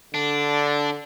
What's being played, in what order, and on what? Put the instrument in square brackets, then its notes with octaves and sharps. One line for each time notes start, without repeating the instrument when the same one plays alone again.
[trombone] D3 [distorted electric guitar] D4